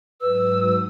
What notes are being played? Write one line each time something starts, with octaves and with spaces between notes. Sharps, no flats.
G#2 F#3 B4 D#6 E6